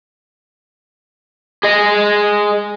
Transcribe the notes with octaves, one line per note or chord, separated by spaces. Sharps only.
G#4 D#5